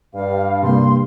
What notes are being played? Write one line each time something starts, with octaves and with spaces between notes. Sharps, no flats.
G2 F5
C3 G3 A#3 C6